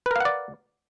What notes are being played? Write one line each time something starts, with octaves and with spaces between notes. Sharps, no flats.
A#4 B4 D5 F5 F#5